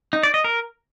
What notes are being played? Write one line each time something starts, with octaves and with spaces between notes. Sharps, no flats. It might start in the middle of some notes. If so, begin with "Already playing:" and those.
D#4
D5
D#5
A#4